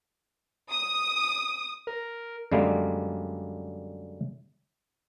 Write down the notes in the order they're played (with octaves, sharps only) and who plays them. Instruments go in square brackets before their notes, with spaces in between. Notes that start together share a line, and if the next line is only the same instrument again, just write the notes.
[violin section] D#6
[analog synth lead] A#4
[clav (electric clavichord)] F#2 D3 G3 G#3 A#3